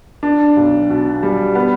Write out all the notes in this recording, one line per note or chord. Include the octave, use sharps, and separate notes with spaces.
D4
B1
B2
G3
B3